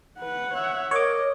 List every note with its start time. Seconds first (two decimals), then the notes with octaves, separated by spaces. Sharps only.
0.20 B4 F#5
0.54 C#5 E5
0.91 A#4 C#5 D#5 D6